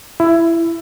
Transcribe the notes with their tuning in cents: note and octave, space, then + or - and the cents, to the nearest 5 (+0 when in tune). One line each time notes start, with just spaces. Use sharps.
E4 +15